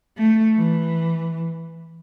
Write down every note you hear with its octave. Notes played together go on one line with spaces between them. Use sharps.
A3
E3